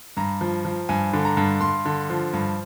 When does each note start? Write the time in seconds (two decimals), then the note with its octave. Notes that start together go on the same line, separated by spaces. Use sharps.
0.17 G2 A#5
0.41 F3
0.65 F3
0.89 G2 G#5
1.13 D3
1.25 A#5
1.37 G2
1.61 G2 C6
1.85 D3
2.10 F3
2.33 G2